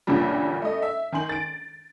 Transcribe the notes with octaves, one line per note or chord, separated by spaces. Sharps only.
A1 D2 G2 A#2 F3 G3
A3 D#5
E5
D#3 G#5 C6 F#7
A6 D7